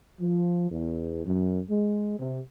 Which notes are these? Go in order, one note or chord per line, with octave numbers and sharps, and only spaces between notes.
F3
E2
F#2
G#3
C3